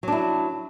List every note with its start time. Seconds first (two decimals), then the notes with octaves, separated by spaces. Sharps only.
0.03 F#3
0.08 D4
0.12 E4